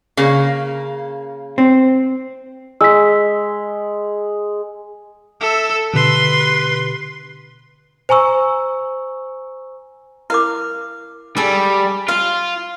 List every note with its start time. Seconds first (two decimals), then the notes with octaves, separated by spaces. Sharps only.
0.17 C#3 A#3
1.58 C4
2.81 G#3 E6 B6
5.41 A4 E5
5.94 B2 D3 G4 B4 C6
8.09 C5 G#5 A#5 C#6 E6
10.30 E4 A#4 F5 D6
11.37 G3 G#4 A4 D5
12.08 F4 F5